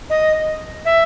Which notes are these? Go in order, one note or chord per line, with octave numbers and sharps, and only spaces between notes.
D#5
E5